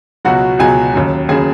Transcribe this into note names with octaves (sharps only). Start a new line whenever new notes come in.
C#2 B2 F#3 F#4 F#5
C#2 B2 F#3 G#4 G#5
D#2 C#3 F#3
D#2 C#3 F#3 G#4 G#5